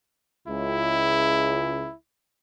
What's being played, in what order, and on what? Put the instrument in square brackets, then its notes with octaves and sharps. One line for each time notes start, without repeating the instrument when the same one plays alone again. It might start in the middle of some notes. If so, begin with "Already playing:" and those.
[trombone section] C#2 [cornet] E4